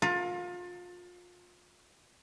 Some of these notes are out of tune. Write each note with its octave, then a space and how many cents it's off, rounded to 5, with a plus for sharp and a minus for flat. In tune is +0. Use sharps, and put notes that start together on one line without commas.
F4 +30 A#4 +0